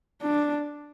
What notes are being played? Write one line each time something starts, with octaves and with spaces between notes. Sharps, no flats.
D4